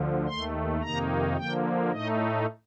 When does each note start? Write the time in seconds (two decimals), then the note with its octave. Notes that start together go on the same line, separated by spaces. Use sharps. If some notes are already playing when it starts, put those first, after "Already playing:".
Already playing: D2 D3 F3
0.27 D#2 D#3 A3 C6
0.82 F2 C3 D#3 A#3 D#4 A#5
1.37 D3 F3 A#3 G5
1.91 A2 A3 D#4 D#5